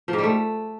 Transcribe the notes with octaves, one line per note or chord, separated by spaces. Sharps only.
F3
G#2
G3
A3